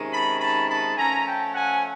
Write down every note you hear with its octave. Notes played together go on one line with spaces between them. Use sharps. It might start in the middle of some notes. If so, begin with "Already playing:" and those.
Already playing: C3 D#3 G#3 C#4
A5 B5
A5 B5
A5 B5
F3 A3 C#4 G#5 A#5
G5 A5
F#5 G#5